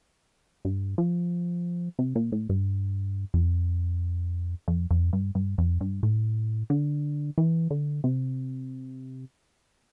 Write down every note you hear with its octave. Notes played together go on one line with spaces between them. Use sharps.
G2
F3
C3
A#2
A2
G2
F2
F2
F2
G2
G2
F2
G2
A2
D3
E3
D3
C3